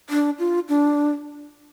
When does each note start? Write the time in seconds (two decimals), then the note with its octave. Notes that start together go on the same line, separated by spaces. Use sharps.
0.10 D4
0.39 F4
0.69 D4